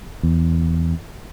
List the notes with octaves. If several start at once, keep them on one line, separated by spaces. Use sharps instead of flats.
E2